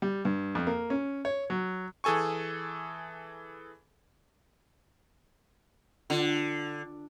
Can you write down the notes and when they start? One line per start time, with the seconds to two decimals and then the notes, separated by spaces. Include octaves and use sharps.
0.02 G3
0.25 G2
0.55 F2
0.67 A#3
0.90 C#4
1.25 C#5
1.50 F#3
2.04 E3 G#4 A4 G#5 C#6
6.10 D3 D4 F4